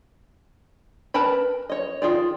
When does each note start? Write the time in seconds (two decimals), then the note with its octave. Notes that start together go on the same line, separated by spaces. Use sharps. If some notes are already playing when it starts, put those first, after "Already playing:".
1.14 A#4 B4 A5 B5
1.70 C#5 D#5
2.02 D#3 F4 G#4 D5